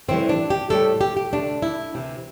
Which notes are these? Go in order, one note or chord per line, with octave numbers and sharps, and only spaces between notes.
A2 E3 G3 C4
D4
G4
A2 G3 A4
G4
G4
D2 C3 A3 D4
E4
D2 C3 E3